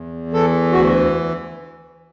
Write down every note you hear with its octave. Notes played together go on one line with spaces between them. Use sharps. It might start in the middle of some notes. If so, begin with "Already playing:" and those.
Already playing: E2
E3 A4
D2 F#4